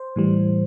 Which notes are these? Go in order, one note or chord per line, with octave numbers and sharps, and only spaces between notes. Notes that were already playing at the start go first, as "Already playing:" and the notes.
Already playing: C5
A2 E3 G3